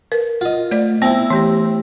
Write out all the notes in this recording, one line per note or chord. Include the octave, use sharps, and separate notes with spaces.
A#4 B4
F4 D#5 F#5
A3 D5
B3 C4 E4
E3 A3 G4 A#6